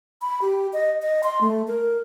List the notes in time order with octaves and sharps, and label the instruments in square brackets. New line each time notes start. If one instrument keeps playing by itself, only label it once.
[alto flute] B5
G4
D#5
D#5
C6
A3
A#4